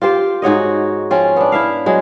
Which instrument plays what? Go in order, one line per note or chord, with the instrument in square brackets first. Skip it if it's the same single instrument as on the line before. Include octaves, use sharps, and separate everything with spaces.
[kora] F4 G4 C5 G5
G#2 F#4 C#5 D#5
F3 C4 C#4
B3 D4
E4 E5 F5
F#3 G#3